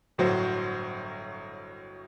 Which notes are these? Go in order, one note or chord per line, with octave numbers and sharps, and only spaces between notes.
G1 A2 F#3 F#4 C5 F#5